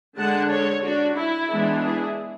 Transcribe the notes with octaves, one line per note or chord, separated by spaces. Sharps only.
D3 G#3 D4 F#5 A5
A4 C#5
D4 F#4
E4
E3 G#3 B3 D4
E4 G#4